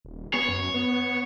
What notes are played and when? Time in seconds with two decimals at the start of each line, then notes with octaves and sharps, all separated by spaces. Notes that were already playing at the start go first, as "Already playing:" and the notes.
0.05 D#1
0.34 B3 C#5
0.48 F#2
0.74 B3